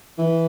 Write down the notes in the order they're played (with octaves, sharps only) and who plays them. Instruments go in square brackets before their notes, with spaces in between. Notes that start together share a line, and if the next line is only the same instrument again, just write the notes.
[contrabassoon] E3